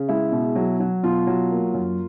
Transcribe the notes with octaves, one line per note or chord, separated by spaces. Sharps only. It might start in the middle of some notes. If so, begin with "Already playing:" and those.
Already playing: C#3
G#3 E4
B2
F#3
F#3
B2 F4
F#3
A#3
F#2